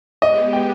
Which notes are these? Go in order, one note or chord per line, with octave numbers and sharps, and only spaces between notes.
G#3 B3 G4 D#5
G5